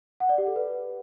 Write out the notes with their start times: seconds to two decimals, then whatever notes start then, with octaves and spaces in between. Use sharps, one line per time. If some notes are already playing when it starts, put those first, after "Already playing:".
0.20 F#5
0.29 D5
0.38 G4
0.47 A4
0.56 B4